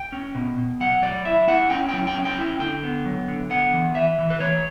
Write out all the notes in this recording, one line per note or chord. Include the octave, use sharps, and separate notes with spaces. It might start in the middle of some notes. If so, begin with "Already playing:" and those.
Already playing: G5
C#4
B2
B2
F#3 F#5
F#3 D5
E4 E5
E4 F#5
C#4 G5
G5
F#3
G5
C#4
G5
E4
D3 G5
B3
F#3
D3
B3 F#5
E3
E3 E5
E3
B4
E3 C#5